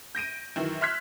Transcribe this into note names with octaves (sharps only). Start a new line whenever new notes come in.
G6 A#6 D7 D#7
F#2 D#3 E3
E5 C6 F6 F#6 G#6 B6